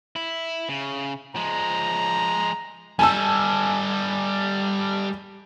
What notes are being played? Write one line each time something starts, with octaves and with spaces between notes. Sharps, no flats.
E4
C#3
F3 G#3 A#5
G3 A4 G#5 A5 E6